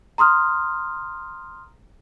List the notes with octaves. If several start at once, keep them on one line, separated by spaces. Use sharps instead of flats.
A#5 C6 D#6 F6